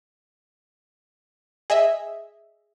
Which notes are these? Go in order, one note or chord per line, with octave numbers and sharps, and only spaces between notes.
G#4 D#5 E5